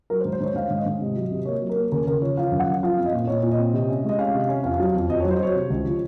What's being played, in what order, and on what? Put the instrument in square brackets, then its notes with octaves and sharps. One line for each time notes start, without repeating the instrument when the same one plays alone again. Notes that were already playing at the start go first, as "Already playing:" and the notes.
[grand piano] F#3 A#4
C5
G#2
C5
G#2 C#5
G#2 F5
G#2
D#5
G#2
C3
F#3
C3
A#3 C#5
F#3
A#4
A#3
C#3 A#4
C#3 A#4
F3 C#5
F3 F5
F#2
F#5
F#2
F3 F5
C4
D#5
A#2
A#2 C#5
A#2
D#5
C4
C3
C#4
G#3 D#5
C#4 F5
C3
C#4
F2 F5
F#3
F2
F2 D#5
F#3 C#5
C5
F#3 C#5
C3
C#2
F3